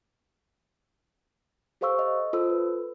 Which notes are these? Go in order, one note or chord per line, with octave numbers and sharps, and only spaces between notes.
G4 A4 C5 F5 C#6 E6
D#5
F4 A4 C5 E6
B4